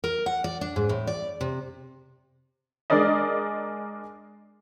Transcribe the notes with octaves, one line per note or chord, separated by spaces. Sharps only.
A#4
F#5
D5
D4
G#2
A2
D5
C3
G#3 D4 A#4 D5 D#5